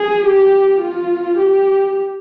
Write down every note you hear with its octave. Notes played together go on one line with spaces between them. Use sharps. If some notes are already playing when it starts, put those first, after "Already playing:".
Already playing: G#4
G4
F4
G4